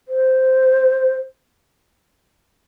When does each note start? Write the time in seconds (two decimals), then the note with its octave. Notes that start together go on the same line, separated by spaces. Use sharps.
0.08 C5